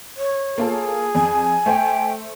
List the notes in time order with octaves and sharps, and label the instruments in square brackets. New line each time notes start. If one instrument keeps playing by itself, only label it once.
[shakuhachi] C#5
[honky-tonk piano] A#3 F4 A4 [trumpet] G#4
[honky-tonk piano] F2 [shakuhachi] G#5
[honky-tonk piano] A3 C5 [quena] G5